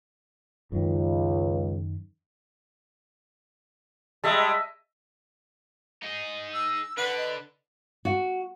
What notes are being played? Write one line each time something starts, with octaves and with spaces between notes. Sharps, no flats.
C#2 F#2 D#3
G3 G#3 D#5 E5 A5
D#4 G#4
E6
D3 D4 B4 F#5
D#5
F#4